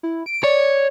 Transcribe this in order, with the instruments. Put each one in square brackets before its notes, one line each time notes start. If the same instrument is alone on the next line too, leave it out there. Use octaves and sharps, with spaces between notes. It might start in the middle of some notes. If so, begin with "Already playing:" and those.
[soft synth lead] E4
D7
[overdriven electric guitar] C#5 [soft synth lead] D5